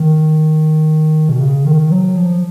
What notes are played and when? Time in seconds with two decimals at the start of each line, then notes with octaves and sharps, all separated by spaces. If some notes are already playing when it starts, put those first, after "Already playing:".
Already playing: D#3
1.29 B2
1.39 C#3
1.64 D#3
1.91 F#3
2.17 F3